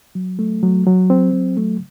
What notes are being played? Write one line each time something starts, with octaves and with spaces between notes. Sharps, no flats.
F#3
A3
F#3
F#3
C4
F#3
A3